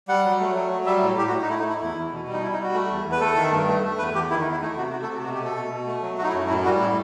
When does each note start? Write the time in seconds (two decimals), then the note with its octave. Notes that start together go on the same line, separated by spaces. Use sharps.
0.08 G3 F#5
0.24 F#3
0.40 A3
0.56 F#3
0.71 F#3
0.86 G3 E5
1.02 A2
1.18 A2 G4
1.28 F#4
1.33 A2
1.42 D#4
1.49 A3 E4
1.59 D#4
1.64 A3
1.70 E4
1.80 E2 E4
1.96 E2
2.12 B2
2.28 G3
2.33 D#4
2.42 G3 E4
2.53 D#4
2.59 G3 F#4
2.74 A3
2.90 E2
3.05 E2
3.12 B4
3.20 A3 A4
3.36 D#3
3.52 G2
3.67 A3
3.84 A3
3.98 E2 B4
4.15 E2 G4
4.30 D#3 E4
4.41 D#4
4.46 E2
4.51 E4
4.61 A3 D#4
4.77 C3 F#4
4.92 A3 F#4
5.03 A4
5.09 C3 F#4
5.24 B2 F#4
5.34 G4
5.39 A3
5.45 A4
5.55 B2
5.70 B2
5.87 A3
6.02 F#3
6.18 A3 F#4
6.23 D#4
6.28 E4
6.33 F#2
6.39 D#4
6.48 A2 E4
6.65 G3 F#4
6.80 A2 E4